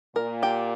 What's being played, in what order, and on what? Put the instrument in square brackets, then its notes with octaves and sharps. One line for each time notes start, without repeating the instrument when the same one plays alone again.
[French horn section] A#2 [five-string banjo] A#4
[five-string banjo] G4